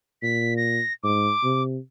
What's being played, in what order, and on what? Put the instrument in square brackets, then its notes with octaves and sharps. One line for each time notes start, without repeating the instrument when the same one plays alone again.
[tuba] A#2 [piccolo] B6
[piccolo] A#6
[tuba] G#2 [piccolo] D6
[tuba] C3